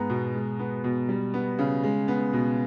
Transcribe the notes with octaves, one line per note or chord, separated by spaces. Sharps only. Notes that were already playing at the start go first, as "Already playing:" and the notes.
Already playing: G#2 G#3 B3 A#5
B2
G#3
B3
B2
G3
B3
C#3
G#3
B3
B2